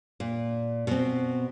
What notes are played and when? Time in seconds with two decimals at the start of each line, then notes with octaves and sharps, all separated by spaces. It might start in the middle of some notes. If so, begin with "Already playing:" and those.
0.20 A#2
0.87 B2 C4